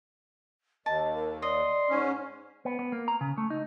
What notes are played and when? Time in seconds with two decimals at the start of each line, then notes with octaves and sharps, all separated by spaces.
0.86 D#2 D#5 A5
1.15 A#4
1.42 D5 D#5 C6
1.90 G#2 C#4
2.65 B3
2.79 B3
2.92 A#3
3.08 A#5
3.21 C#3
3.38 A3
3.50 D#4